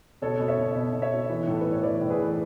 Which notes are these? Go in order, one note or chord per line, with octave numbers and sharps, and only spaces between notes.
B2 A4 C#5
B2
C#5 E5
B2
B2
B2
C#5 E5
B2
E3
A2 A4
A2 B4
C#5
E3 B4 D5
A2
G#4 B4
E3